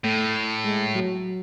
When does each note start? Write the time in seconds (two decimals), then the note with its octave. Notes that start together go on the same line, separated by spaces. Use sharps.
0.04 A2 A3
0.64 G#3
0.94 F#3